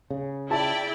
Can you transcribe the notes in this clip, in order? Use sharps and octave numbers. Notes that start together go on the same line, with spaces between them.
C#3
E4 F4 G#4 D5 E5 G5 A5